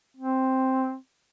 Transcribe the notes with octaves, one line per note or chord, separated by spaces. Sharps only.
C4